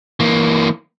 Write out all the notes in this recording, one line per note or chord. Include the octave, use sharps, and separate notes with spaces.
E3 A#3